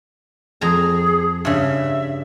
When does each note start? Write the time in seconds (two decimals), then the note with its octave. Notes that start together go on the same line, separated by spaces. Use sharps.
0.61 F2 G#4 G#5 A#5
1.45 G2 C#3 E5